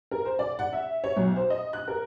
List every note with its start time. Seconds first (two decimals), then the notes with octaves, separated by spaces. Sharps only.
0.11 A#4
0.25 C5
0.39 D5
0.59 F#5
0.73 E5
1.04 C#5
1.17 B1
1.36 C5
1.50 D#5
1.73 F#6
1.88 A#4